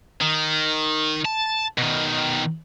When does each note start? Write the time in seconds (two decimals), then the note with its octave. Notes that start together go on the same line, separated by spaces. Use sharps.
0.21 D#3
1.25 A5
1.78 B2 D#3